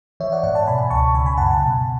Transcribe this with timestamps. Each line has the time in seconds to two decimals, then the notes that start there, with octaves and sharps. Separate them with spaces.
0.20 E3 C#5 E5
0.32 D5 F#5
0.43 G#2 D5 F#5
0.55 F#5 A5
0.67 B2 G#5 B5
0.90 C#2 A5 C#6
1.15 C#3 G#5 B5
1.26 G#5 B5
1.38 F#2 F#5 A5
1.49 F#5 A5
1.62 B2